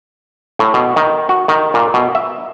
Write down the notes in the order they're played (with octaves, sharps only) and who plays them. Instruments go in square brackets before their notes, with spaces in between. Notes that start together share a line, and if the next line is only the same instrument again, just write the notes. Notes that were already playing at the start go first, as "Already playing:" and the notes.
[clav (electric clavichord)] A2
B2
D#3
F#4
D#3
A#2
B2
E5